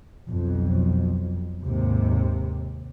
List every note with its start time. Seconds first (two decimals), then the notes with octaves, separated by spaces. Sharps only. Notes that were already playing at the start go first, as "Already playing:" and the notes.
0.28 B1 F2
1.64 D#2 G#2 C3